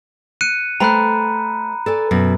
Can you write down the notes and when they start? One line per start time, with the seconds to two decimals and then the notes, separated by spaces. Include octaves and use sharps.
0.41 F#6 C#7 D#7
0.80 A3 C5 G5 A#5 B5 F#6
1.86 A4 D5 G#5
2.11 F#2 B2